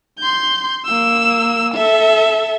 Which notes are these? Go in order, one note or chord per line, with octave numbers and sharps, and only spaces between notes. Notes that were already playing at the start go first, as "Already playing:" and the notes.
C6 G6
A#3 E6
A4 E5